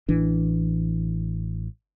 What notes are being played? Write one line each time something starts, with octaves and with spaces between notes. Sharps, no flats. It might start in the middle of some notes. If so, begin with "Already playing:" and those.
A1 E3 D4